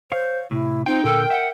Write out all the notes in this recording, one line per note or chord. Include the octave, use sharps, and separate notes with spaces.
C5 C#5 F5
A2 C3 E4
C4 D#4 F4 G5
A#2 D3 A4 A#4
E5 F#5